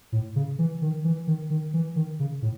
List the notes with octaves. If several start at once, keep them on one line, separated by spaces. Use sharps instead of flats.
A2
C#3
E3
D#3
E3
D#3
D#3
E3
D#3
C#3
A2